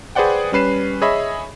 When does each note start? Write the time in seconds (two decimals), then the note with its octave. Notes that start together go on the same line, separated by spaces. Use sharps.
0.15 G#4 B4 C5 D5 F#5 G5
0.52 G3 C#4 B4 C7 E7
1.01 G#4 C#5 D#5 E5 B5